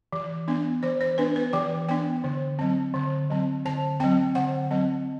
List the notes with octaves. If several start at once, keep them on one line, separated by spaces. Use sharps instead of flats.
E3
B3 D4
E3 C5
C5
B3 D4 B4
B4
E3 G5
B3 D4 G5
D3
F#3 C4
D3
F#3 C4
D3 A5
F#3 C4 G5
D3 F#5
F#3 C4